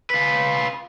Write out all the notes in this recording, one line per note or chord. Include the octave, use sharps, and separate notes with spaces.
F4 B4